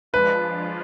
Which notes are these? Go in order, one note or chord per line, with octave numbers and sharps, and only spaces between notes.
F3 G#3 D4 F4 B4